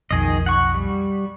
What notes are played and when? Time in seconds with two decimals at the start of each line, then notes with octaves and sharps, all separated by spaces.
0.11 B1 F2 D#3 G#4 D#5
0.46 F#5 C#6
0.74 G3